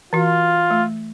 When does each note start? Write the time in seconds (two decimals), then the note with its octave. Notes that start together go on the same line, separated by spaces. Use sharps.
0.13 E3 F4 F#4
0.71 A3